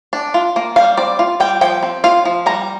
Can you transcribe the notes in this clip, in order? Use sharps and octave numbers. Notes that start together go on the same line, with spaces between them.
D4
F4
A#3
G3 F5
C4 D5
F4
G3 G5
F3 G5
C4
F4 F5
F3
G3 A#5